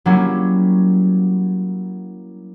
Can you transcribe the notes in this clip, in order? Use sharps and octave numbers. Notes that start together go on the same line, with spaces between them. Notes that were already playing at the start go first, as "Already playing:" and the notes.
F#3 G3 A#3 C#4 E4